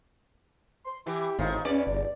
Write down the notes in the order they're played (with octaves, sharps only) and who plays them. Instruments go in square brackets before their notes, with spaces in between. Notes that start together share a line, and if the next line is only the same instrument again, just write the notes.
[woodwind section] C6
[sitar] E3 [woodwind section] E4 G4
[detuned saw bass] G#1 [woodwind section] A2 C4 F4 [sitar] D#3
[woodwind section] E2 [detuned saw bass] C#4 [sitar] D5
[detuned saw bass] G1